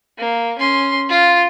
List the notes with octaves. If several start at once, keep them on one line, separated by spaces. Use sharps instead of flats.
A#3
C#4 C6
F4